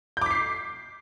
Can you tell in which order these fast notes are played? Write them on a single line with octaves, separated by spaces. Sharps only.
G6 D6 B6 C7